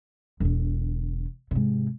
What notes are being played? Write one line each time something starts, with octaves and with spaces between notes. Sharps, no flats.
E1 D3
G#2 C3